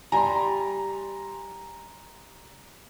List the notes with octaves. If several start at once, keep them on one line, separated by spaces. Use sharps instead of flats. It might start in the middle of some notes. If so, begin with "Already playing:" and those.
G3 G#5 A#5 C6